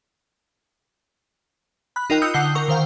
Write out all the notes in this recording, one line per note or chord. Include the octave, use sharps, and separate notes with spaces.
B5 F#6
D#4 F4 A#4 D#5 G5
D#6 E6 F#6 G6 C#7
D3 F#5 E6 G6 C7 G7
A#4 C#6
D#3 C5 F5 G5